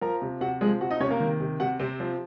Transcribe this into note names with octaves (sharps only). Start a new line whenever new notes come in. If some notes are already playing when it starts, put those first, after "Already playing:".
F3 A#4 A#5
C3
C3 F#4 F#5
F3 G#3 G#4
C3 F#4 F#5
D#4 D#5
C3 C#4 C#5
A#3 A#4
D#3
C3
C3 F#4 F#5
C3 C4 C5
F3